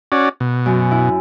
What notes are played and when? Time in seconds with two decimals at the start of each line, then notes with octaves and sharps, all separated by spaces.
0.12 C#4 F#4 D5
0.40 B2
0.66 F#2
0.91 E4